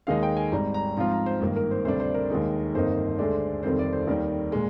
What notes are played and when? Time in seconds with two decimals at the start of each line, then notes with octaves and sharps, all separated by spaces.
0.07 D#2 D#3 G#3 D#4 F5
0.23 G5
0.37 G#5
0.52 G#1 G#2 G3 A#5
0.74 A#5
0.97 G#2 F3 C4 F4 A#5
1.12 A#5
1.26 C5
1.41 G#1 G2 D#3 A#3
1.56 A#4
1.71 C5
1.85 D2 C3 G3 D4 C5
2.00 C5
2.14 A#4
2.30 D#2 D#3 G#3 D#4
2.75 G1 F2 D#3 A#3 D#4 C5
3.19 D2 D3 G#3 D4
3.63 F1 F2 D#3 G3 C4 C5
3.79 D5
3.93 C5
4.07 D#2 D#3 G3 A#4
4.52 A#2 G#3